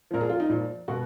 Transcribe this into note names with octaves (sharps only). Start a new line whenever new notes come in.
A#2 F3 A#4
G#4
F4
D#4
A#2 F3
B2 F#4